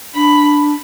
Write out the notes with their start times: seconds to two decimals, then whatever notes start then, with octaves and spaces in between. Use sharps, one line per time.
0.15 D4 B5